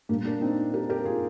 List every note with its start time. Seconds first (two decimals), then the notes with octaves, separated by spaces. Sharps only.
0.09 A#2 G3 A#3 D4
0.25 A#3 D4
0.41 C4 D#4
0.74 G4 A#4
0.90 G4 A#4
1.05 F4 G#4